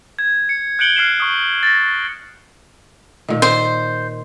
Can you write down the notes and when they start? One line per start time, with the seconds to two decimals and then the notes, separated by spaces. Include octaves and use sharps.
0.19 G#6
0.49 C#7
0.79 F#6 G6 C#7 D7 F#7 G7
0.96 F6 F#6 C7 D7 E7
1.20 C#6 D#6
1.63 A6 A#6
3.29 A#2 D#3
3.42 C5